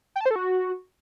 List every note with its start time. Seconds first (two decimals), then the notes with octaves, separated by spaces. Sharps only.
0.16 G5
0.21 A5
0.26 C5
0.31 A4
0.36 F#4